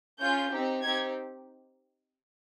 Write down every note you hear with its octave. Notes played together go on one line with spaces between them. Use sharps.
C#4 F4 G#4 G6
C4 D#4 G4
C4 D#4 G4 G#6